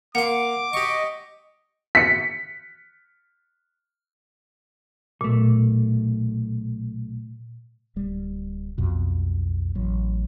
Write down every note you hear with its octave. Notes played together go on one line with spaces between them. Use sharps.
A#3 F#5 C6 D6
G4 D#5 C#6
B6 C#7
B1 A#2 A3
D1 G3
B1 F2 B2
A1 F#3